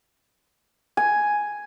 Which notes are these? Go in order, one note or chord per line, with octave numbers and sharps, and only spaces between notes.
G#5